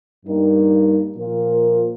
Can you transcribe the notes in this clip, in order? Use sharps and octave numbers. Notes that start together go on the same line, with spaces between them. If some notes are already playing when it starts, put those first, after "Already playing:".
G2 G3 A#3 D#4 A#4
A#2 F3 A#3 F4 A#4